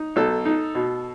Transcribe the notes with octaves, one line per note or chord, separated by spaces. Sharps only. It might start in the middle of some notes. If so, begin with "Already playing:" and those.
Already playing: D#4
B1 A4
D#4
B2